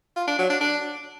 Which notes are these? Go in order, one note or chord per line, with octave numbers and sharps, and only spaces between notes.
F4
D4
F#3
D4
D4